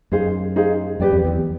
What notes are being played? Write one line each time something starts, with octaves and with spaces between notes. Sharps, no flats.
F#2 D#4 G#4 C5 F5
D#4 G#4 C5 F5
F#2 G4 B4 D5 G5
F2
E2